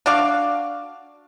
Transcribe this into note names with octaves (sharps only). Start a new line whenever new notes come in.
D4 F#4 D5 F5